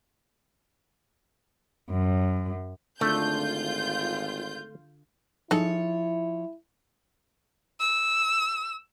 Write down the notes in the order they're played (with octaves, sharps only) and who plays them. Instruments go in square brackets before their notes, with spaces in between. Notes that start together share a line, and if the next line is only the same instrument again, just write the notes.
[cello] F#2
[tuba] G#1 [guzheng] D3 [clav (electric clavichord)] A3 [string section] F4 G6
[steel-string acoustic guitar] F3 C#5 [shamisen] D#4 G#4 A4 [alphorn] E4
[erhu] E6